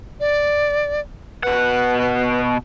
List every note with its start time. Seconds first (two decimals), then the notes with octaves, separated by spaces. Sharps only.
0.20 D5
1.43 B2 B4 F#5